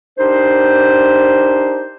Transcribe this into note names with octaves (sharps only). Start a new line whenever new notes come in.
D4 D#4 G4 A#4 C5